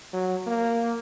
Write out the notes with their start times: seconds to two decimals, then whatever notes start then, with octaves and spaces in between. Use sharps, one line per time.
0.13 F#3
0.47 A#3